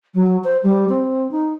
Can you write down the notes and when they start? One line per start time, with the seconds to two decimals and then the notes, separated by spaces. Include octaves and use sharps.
0.15 F#3
0.44 C5
0.63 G3
0.89 C4
1.31 D#4